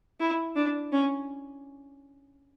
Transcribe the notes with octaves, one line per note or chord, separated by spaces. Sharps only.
E4
D4
C#4